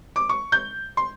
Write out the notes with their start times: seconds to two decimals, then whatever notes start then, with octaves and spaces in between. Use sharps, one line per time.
0.16 D6
0.29 C#6
0.52 G6
0.97 C6